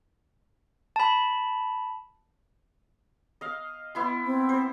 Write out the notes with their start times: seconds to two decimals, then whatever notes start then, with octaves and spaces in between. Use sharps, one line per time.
0.96 A5 B5
3.41 D#5 F5
3.95 B3 E4 C6
4.25 C4
4.49 C5